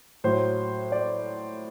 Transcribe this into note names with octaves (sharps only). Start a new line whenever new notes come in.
A2 F#3 C5
D5